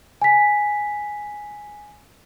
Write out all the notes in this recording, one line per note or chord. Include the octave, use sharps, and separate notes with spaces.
G#5 B6